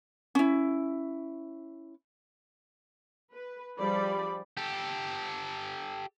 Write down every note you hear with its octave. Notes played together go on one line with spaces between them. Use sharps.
C#4 E4
B4
F3 G3 D4 G#4 D5 B5
G4 A4